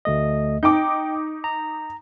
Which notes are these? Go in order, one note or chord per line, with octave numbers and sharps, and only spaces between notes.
D2 A3 D#5
D#4 G5 D6 G6
A#5